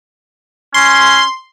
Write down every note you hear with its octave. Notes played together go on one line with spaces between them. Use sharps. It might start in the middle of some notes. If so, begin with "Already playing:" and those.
C#4 C6